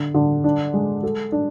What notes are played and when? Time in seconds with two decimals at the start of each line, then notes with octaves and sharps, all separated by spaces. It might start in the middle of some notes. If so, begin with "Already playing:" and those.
Already playing: D3
0.14 D3
0.44 D4
0.74 G#3
1.03 A4
1.32 D4